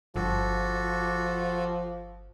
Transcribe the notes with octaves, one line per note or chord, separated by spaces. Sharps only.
G1 F3 F#4 G4 A4